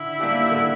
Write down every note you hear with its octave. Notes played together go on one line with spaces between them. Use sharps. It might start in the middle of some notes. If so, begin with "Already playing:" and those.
Already playing: D3 E4
G3 A#3 D4 G4
D3